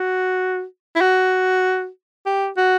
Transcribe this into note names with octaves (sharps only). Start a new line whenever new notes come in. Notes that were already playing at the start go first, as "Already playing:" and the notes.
Already playing: F#4
E4
F#4
G4
F#4